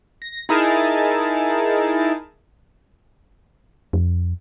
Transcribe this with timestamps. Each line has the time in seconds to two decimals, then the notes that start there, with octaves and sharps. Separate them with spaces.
0.22 A#6
0.49 D#4 E4 G#4 A#4 A5
3.93 F2